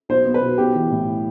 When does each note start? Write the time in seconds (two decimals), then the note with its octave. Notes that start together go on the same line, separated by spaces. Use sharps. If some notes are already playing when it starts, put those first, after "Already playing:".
0.09 B1 C5
0.25 B3
0.34 B4
0.42 B2
0.58 B1 G4
0.75 E3
0.91 A2